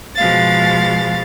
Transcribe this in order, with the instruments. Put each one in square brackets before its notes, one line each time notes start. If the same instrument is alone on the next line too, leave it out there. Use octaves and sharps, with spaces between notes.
[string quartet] B2 F3 G#3 F5 A6